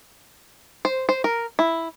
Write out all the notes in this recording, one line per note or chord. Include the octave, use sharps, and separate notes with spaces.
C5
C5
A#4
E4